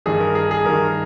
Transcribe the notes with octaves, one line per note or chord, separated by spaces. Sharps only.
G2 D#3 G#4
A#4
G#4
G#4
G2 D#3 A#4